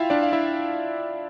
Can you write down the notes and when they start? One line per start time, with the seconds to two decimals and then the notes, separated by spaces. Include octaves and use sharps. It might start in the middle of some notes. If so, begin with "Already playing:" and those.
Already playing: E4 F4 E5 F5 G5
0.10 D4 D5
0.23 F5
0.32 E4 E5